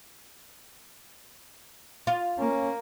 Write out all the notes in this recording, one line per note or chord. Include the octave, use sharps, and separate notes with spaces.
F4
A#3 C#4